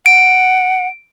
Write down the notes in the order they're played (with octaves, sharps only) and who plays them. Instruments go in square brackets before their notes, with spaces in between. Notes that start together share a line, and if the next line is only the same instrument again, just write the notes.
[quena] F#5 [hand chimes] D7